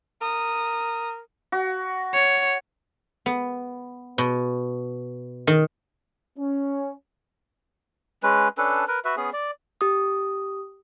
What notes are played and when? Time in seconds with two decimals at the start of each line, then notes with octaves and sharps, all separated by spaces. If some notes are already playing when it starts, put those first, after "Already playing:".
0.21 A#4 D#6
1.52 F#4
2.14 C#5
3.26 B3
4.18 B2
5.47 D#3
6.39 C#4
8.23 G#3 C#4 B4
8.58 C#4 D4 A4 B4
8.88 A#4 B4
9.05 F#4 B4 E5
9.17 B3 C#4 G#4
9.33 D5
9.81 G4 D#6